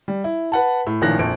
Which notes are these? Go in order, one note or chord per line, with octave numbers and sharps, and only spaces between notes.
G3
E4
B4 F#5 A5
A2
A1 A#2 D#3 F3 F#6 A#6
A#1 F2 D7